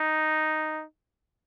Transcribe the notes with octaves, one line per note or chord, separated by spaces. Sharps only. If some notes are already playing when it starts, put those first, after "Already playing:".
Already playing: D#4